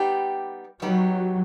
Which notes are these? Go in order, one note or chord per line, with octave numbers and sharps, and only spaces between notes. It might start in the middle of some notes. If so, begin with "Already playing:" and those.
Already playing: G3 B3 D#4 G4
F#3 G3 B3 D#4 G4